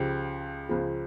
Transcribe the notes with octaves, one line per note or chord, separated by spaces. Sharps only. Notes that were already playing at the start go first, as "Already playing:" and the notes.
Already playing: C#2 C#3 F3 G4
C#2 C#3 F3